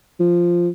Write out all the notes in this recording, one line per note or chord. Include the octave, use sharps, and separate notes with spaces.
F3